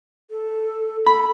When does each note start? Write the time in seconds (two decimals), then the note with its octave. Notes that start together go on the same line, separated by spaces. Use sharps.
0.31 A4
1.06 A4 B5